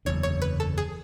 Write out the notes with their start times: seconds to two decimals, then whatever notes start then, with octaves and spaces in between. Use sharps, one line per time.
0.05 F#1 E2 D3 C#5
0.23 C#5
0.42 B4
0.60 A4
0.78 G#4